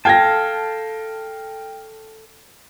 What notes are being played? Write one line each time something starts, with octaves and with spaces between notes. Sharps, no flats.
A4 F5 G5 A5 G#6 A#6